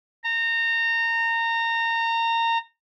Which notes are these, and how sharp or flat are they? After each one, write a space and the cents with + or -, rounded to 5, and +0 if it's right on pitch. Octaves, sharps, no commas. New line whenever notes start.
A#5 -25